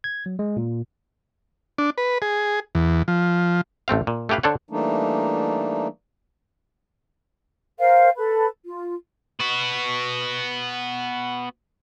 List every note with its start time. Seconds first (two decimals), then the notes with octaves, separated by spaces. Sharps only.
0.04 G#6
0.26 F#3
0.39 G#3
0.57 A#2
1.78 D4
1.98 B4
2.22 G#4
2.75 E2
3.08 F3
3.88 A1 A3 C4 F5
4.07 A#2
4.29 A3 C#4 G4 B4 F5
4.43 D3 D4 A4 C5 C#5 F#5
4.70 E3 G3 A3 A#3 D4 D#4
7.80 A#4 C5 F5 G5
8.16 A4 B4 B5
8.66 F4
9.40 B3 F#4